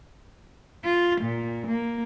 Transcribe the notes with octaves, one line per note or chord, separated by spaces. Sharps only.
F4
A#2
A#3